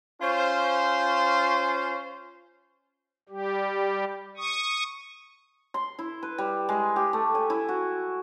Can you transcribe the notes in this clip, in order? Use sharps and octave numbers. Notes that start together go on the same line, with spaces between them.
C#4 F4 C5
G3 G4
C#6 D#6
C6
E4
B4
G3
G#3
G4
A3
G#5
E4
F#4